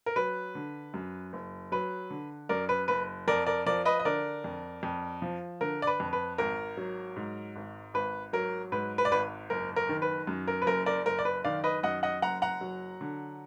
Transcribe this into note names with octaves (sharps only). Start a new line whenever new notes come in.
A#4
F#3 B4
D3
F#2
F#1
F#3 B4
D3
F#2 A#4 D5
B4
F#1 B4
F2 A#4 D5
A#4 D5
F3 A#4 D5
B4 D#5
D#5
D3 A#4 D5
F2
F2
F3
D3 A#4
D5
B4
F2
B4
G#1 A#4
F#3
G#2
G#1
G#1 B4
F#3 A#4
G#2 B4
B4
D5
G#1 B4
F#1 A#4
A#4
D#3
B4
F#2
A#4
B4
F#1 A#4
A#4 D5
F#1 A#4
D5
B4
D#3 D5 F5
B4 D#5
F#2 D#5 F#5
D#5 F#5
F#1 F#5 A#5
F#5 A#5
F#3
D3